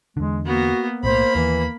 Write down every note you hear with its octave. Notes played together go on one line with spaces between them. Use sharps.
E2 D3 G#3
A#3 B3 F#4
B1 A2 A#3 C5 B5
D#2 E3